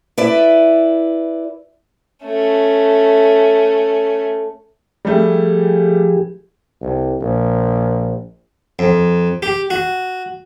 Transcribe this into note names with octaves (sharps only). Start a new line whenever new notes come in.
E4 B4 D5
A3 C#4
F3 G3 A3 G4 G#4
C2
A#1
F2
G4
F#4